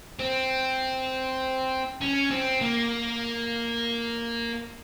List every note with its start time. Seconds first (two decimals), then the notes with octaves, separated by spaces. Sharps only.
0.19 C4
2.01 C#4
2.31 C4
2.61 A#3